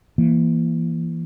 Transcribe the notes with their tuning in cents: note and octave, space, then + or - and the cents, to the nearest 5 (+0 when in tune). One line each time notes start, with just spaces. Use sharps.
E3 +15 A#3 +15